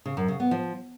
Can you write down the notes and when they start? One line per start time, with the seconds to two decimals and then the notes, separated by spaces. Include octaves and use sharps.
0.05 C#3
0.17 F#2
0.28 C#3
0.40 B3
0.51 F3